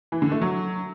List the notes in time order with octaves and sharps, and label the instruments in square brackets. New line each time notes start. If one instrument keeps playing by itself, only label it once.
[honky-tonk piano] E3
D3
A3
F#3